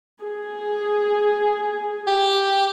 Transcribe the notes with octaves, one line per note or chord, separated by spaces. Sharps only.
G#4
G4